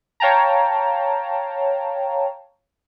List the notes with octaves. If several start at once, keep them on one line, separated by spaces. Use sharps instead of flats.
C#5 F5 G5 A5 A#5